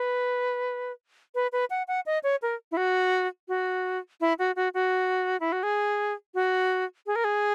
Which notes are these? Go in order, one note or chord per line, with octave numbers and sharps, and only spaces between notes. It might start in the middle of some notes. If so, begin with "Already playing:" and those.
Already playing: B4
B4
B4
F#5
F#5
D#5
C#5
A#4
E4
F#4
F#4
E4
F#4
F#4
F#4
E4
F#4
G#4
F#4
G#4
A#4
G#4